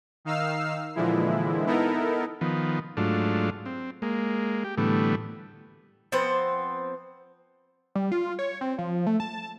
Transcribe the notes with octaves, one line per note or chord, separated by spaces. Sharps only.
D#3 D#4 F5 E6 F6 C7
A#2 D3 E3 F3 G#3 E4
B3 D#4 E4 A4 A#4
D#3 F3 B3
G#2 F#3 A3 D4 F4
C4
G#3 A#3
G4
A2 D3 E3 G3 A3 B3
F3 B3 C4 C5
G3
F4
C#5
C4
F3
A3
A5